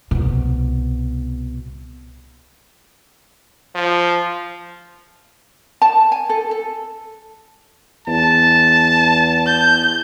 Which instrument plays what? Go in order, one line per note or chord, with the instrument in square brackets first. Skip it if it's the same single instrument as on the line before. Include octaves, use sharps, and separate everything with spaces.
[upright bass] C2 B2
[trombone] F3
[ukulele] A5
G#5
A4
A4
[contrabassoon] E2 [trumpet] A5
[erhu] G6